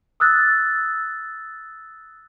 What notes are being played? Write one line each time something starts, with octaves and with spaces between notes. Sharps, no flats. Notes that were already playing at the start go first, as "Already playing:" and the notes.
D#6 E6 F#6 A6